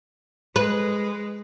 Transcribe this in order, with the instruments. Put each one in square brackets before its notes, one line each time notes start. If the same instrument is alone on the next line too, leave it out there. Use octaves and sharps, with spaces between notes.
[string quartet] G#3 [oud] B4